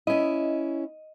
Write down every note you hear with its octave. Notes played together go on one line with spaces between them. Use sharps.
C#4 E4 D#5